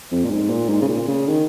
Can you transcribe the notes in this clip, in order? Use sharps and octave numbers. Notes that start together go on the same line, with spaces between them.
F2
A#2
G#2
A#2
G#2
C#3
A#2
C#3
D#3